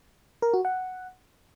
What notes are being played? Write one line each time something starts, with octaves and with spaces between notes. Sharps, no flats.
A#4
F#4
F#5